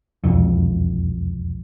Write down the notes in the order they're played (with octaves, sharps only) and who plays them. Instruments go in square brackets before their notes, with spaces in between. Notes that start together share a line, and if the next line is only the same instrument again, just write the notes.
[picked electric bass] E1 C2 F2